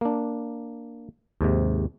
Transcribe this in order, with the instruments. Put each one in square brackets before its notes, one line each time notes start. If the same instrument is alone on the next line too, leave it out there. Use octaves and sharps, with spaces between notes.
[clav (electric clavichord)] A#3 D4
D#2 G#2 C3